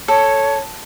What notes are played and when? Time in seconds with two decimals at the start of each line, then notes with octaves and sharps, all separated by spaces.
0.08 A4 C#5